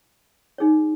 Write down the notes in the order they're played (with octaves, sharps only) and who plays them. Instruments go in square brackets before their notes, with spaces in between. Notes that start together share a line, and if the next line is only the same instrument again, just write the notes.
[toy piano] D#4 G#4 C#5